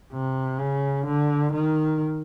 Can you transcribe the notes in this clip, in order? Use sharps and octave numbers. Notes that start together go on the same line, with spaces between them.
C3
C#3
D3
D#3